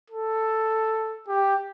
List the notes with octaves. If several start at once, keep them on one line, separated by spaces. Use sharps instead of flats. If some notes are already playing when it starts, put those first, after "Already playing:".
A4
G4